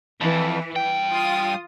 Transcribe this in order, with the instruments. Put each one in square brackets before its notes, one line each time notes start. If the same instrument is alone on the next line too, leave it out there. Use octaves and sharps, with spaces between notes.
[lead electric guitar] F2 [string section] E3
[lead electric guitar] G2 G5
[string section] F4 D#6